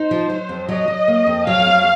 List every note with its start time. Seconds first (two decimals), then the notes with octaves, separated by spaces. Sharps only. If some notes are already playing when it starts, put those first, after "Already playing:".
Already playing: D#4 C5
0.11 F3
0.30 F#3
0.49 F2
0.69 F#3 D#5
0.88 F#3
1.08 A#3
1.27 F2
1.47 F#3 F5
1.66 F2